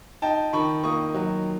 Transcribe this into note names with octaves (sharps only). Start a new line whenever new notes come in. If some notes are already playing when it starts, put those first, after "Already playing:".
D#4 G5 A5
D#3 B5 C#6
A#3 C#6 D#6
F#3